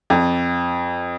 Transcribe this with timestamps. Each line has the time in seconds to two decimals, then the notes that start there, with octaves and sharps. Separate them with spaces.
0.10 F2